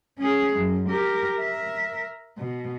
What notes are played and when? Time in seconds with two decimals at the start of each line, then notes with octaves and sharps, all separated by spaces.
0.19 C#4 G#4
0.56 F#2
0.89 G4 A#4
1.39 A#4 E5
2.38 B2